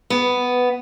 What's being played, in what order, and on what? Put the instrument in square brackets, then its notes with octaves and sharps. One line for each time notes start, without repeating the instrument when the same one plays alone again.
[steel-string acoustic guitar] B3